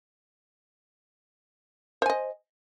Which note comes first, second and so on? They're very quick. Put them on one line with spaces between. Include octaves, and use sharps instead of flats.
C5 G#5 D#5